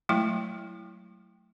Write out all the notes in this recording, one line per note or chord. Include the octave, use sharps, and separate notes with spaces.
F#3 G#3 A3 E4 G5 C#6